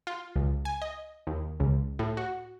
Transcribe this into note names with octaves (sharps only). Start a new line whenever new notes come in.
F4
C#2
G#5
D#5
D#2
C#2
A2
F#4